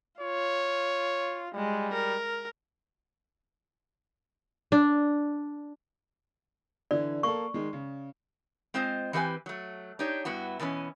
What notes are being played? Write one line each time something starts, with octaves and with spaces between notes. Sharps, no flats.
F4 C#5
G3 G#3
A#4
D4
D3 E3 D5
A#3 A4 C#6
D#3 G#3
C#3
G#3 C4 F4 C5 D#5
E3 C4 G4 B4 D#5 G#5
F#3 A3
D4 D#4 G4 C#5
G2 B3 E4 F#4
B2 E3 B3 C#4